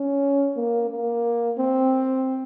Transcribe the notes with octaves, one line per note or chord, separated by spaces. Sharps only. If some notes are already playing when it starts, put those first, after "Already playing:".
Already playing: C#4
A#3
A#3
C4